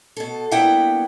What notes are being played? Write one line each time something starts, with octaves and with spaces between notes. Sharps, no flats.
B2 A4
G2 A#3 B3 E4 F#5 G5